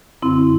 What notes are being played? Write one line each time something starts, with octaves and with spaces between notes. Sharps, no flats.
F#2 D3 C4 E4